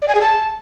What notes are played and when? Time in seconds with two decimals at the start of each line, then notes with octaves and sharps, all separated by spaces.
0.02 D5
0.08 G#5
0.15 G#4
0.21 A5